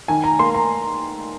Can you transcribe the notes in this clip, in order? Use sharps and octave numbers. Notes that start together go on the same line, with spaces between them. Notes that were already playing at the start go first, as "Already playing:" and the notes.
D#3 G#5
A#5
A#3 C6
A#5